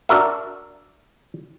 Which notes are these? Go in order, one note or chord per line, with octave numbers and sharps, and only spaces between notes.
D4 F#4 A#4 E5